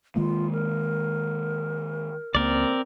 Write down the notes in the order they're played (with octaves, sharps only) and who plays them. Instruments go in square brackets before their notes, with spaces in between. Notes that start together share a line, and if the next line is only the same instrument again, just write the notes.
[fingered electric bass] D#3 G#3 A#3 [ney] F4
[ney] A#4
[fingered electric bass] C#2 A#3 [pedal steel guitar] C4 A#4 D5